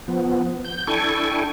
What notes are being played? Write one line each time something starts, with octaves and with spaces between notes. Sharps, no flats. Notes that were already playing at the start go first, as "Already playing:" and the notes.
F3 B3
G6
D4 E4 A4 G5 G#5 C#6